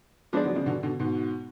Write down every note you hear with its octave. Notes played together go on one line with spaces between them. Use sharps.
F3 G#3 B3 D4 G#4 D5
D3 F#3
C#3 F3
B2 D3
B2 D3
G#2 B2